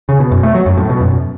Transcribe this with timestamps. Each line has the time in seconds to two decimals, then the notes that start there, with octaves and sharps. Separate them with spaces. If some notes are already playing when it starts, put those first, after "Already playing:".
0.09 C#3
0.20 B2
0.32 F#2
0.43 A3
0.55 F#3
0.66 F#2
0.78 A2
0.90 B2
1.01 F#2